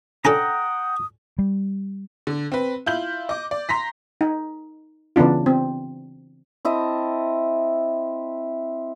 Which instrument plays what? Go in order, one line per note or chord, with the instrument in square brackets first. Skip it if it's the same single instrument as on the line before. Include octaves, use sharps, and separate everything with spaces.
[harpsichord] C#4 D4 A4 [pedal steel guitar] F#5 G5 A#5 [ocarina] D#6
[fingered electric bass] G3
[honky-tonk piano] D3
C4 B4
E4 F4 G6 F#7
D#5 D6
D5
A#5 C6 A#6 B6
[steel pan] D#4
C#3 E3 B3 D4 F4
C4
[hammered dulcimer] C4 E4 D#5 A5